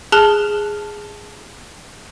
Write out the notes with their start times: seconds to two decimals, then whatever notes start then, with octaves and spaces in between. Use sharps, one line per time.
0.12 G#4 A5 F6 F#6 F7 G7